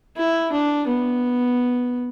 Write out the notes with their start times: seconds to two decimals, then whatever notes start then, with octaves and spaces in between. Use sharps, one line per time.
0.17 E4
0.52 D4
0.88 B3